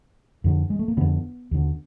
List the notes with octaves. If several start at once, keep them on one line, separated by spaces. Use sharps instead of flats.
F2 D3
G#3
A3
A#3
F2 D3 B3
D#2 D3